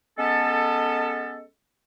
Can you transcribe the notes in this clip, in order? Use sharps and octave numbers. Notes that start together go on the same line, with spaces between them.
G#3 B3 C#4 A4